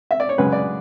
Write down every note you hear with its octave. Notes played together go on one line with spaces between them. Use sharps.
E5
D5
C#5
F#2 C#3 G#3 B4
D5